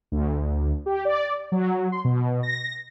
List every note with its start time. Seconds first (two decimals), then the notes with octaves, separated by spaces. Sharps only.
0.12 D2
0.86 G4
1.05 D5
1.52 F#3
1.92 C6
2.05 B2
2.43 A#6